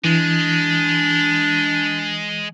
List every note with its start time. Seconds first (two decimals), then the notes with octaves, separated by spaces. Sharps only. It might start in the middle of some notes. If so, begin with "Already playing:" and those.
0.04 E3 G#3 D4